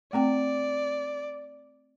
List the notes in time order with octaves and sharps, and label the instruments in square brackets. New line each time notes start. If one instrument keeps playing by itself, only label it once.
[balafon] A3 C4 G5 [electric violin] D5